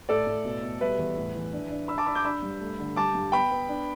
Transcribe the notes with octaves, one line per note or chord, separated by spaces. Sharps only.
A2 A4 D5
A2
B2
B2
G3 B4 E5
E2
A2
E3
D4
D4
D4 B5 E6
A5 D6
D4 B5 E6
D6 G6
D4 B5 E6
G2
A3
D3
G3 A5 D6
G2
B3 G5 B5
B3
D4